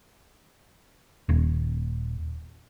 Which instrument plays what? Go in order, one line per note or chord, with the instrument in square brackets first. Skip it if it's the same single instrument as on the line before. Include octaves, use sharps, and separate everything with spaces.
[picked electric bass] D#1